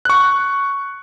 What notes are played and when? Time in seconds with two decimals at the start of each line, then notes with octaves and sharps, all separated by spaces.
0.05 C#6 F#6